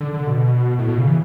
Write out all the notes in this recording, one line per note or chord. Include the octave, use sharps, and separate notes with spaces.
D3
D3
B2
A2
B2
C#3
E3